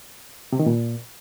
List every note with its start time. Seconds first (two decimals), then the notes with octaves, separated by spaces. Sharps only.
0.53 C3
0.59 D#3
0.66 A#2